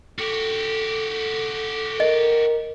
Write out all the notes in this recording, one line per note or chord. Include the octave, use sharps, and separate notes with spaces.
F#4 G4 A4
A#4 D#5